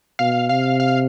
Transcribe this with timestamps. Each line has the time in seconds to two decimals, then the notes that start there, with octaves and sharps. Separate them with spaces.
0.19 B2 F5
0.49 C3 F5
0.80 F5